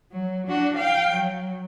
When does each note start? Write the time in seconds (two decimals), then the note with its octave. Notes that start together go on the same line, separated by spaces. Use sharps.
0.12 F#3
0.47 D4 F#4
0.77 F5 G5
1.14 F#3